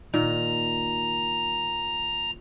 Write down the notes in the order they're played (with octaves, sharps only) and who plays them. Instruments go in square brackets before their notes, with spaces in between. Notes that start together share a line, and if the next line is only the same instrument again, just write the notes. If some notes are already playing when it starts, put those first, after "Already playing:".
[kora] A#2 D#3 [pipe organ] A#5